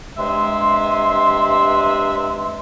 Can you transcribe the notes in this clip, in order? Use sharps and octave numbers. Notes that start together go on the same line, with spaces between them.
G2 C3 G#3 E5 C6